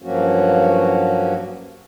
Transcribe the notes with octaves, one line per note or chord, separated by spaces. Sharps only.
G2 F3 F#3 A#3 C#4 F#4